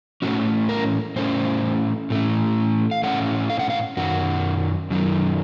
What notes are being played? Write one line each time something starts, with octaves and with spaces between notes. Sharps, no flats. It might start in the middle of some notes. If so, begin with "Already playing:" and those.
A2 A3 C#4 F#4
A#4
A2 A3 C#4 C5
A2 A3 C#4
F5
A2 A3 C#4 F#5
F5
F#5
F5
F#2 D#3 F#3 F#4
F#2 D#3 F#3